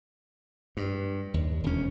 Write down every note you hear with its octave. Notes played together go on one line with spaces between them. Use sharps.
G2
D#2
E1 D2 C#4